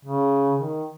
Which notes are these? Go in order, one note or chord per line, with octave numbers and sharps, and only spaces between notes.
C#3
D#3